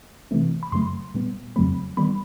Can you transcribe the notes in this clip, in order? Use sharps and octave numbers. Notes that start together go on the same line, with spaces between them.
C3 E3 A3 C4
B5
F#2 C#3 F#3 A3 C6
A#2 G3 B3
F2 C#3 F#3 A3 C4 B5
D#3 G3 B3 B5